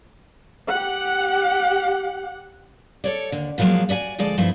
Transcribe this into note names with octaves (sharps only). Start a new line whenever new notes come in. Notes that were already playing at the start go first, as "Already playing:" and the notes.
G4 F#5
A4 C#5 D5
D#2 D3
A#2 F3 F#3 G#3 A#3
F#4 D5 E5 G#5
D2 F3 G#3 A4 D5
G2 F3 A3 C4 E4